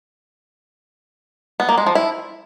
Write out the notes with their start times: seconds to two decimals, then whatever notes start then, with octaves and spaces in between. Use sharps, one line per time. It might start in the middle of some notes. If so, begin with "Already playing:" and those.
1.60 B3
1.69 A#3
1.78 G#3
1.86 F3
1.95 E4